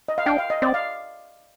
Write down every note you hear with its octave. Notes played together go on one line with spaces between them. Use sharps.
D#5
F5
D4 G5
F5
D#5
C4 D5
F5